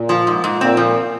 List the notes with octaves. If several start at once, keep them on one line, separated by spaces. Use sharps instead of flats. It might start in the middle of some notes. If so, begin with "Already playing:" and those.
Already playing: A#2
F3
G#2
G#2
A#2 C4
F3